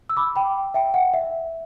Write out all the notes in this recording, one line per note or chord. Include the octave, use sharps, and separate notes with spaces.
E6
B5 D6
G5 B5
E5 G5
F#5
E5